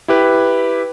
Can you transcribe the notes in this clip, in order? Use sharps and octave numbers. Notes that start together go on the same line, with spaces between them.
E4 G4 B4